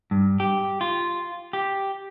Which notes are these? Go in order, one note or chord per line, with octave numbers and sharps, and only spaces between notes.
G2
G4
F4
G4